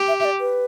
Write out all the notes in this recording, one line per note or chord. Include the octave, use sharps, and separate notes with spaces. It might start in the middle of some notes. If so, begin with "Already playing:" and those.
Already playing: G4
E5
E5
D5
B4